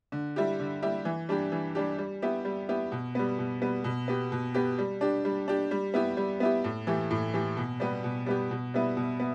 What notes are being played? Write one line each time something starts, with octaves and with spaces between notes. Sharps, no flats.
D3
G3 E4 G4
D3
G3 E4 G4
E3
G3 D4 G4
E3
G3 D4 G4
G3
B3 E4 G4
G3
B3 E4 G4
B2
G3 B3
B2
G3 B3
B2
B3 G4
B2
B3 G4
G3
D4 G4
G3
D4 G4
G3
B3 E4 G4
G3
B3 E4 G4
A2
E3 A3 G4
A2
E3 A3 G4
B2
G3 B3 G4
B2
G3 B3 G4
B2
G3 B3 E4
B2
B3